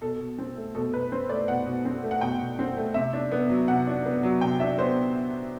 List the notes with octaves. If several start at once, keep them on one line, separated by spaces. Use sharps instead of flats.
B2 A4
B2
C4
A3
B2 A4
B2 B4
C4 C5
A3 D5
B2 F#5
B2
C4
A3
F#5
B2 G5
B2
C4
A3
C3 E5
D4
B3
F#3
C3 F#5
D4
B3
F#3
C3 G5
D4 E5
B3 C5